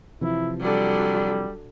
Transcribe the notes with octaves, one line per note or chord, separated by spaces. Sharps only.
C3 E3 F3 E4
D3 F#3 G3